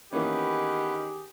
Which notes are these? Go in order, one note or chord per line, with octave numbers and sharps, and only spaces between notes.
D#3 E3 A#3 B3 C#4 G4 G#4 B4